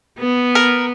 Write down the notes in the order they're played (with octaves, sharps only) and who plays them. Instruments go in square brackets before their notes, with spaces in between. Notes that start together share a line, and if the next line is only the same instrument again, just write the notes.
[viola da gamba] B3
[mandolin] A#4